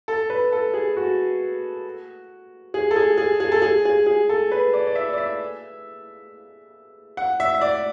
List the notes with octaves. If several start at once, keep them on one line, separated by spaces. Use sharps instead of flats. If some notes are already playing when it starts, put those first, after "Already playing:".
A4
B4
A4
G#4
F#4
G#4
A4
G#4
G#4
G#4
A4
G#4
G#4
G#4
A4
B4
D5
D5
E5
D5
E5
F#5
E5
E5
D5